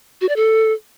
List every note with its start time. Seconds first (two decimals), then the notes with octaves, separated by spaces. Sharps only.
0.21 F#4
0.29 D5
0.36 A4